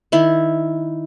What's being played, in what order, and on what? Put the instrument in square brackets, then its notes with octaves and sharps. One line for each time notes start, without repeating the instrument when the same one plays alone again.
[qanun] D#3 E4